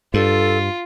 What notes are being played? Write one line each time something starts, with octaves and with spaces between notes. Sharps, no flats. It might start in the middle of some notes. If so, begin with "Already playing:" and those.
G2 F4 A4